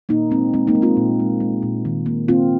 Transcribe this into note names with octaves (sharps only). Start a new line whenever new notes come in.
A#2 A#3 D#4
G#3 C4
G#3 C4
A#3 D#4
G#3
C4 F4
A#2
G#3
G#3
A#2
D#3
A#3
A#3 C4 F4